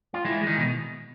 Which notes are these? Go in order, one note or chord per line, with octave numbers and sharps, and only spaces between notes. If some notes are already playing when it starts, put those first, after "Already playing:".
F4
E3 G#3 E4
G#3
D#3 D#4
B2